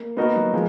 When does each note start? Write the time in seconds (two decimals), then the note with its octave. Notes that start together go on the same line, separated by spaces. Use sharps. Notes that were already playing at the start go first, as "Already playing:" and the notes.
Already playing: A#3
0.17 A#3 B3 D#4 F#4 A#4
0.36 F#3
0.53 F3 G#3